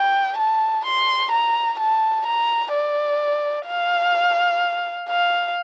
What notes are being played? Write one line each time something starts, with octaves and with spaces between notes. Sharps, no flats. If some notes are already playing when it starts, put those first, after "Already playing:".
Already playing: G5
A5
C6
A#5
A5
A#5
D5
F5
F5